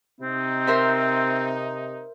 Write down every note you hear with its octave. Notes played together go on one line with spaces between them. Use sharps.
C3 C4 D#4
A#4 C5 E5